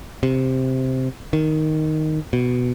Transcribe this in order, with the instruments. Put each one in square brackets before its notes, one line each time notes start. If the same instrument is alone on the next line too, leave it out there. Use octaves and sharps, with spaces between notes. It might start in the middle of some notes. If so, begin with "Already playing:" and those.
[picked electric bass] C3
D#3
B2